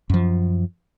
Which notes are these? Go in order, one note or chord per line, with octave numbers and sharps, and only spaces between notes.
F#2 F3